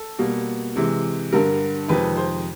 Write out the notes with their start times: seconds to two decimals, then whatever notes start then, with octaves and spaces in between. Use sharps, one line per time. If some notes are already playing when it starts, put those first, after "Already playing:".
Already playing: A4
0.19 B2 G3 A#3
0.76 C3 E3 G#3
1.32 G2 D3 G3 A#4
1.88 F2 C3 D#3 G#3 B4
2.16 C5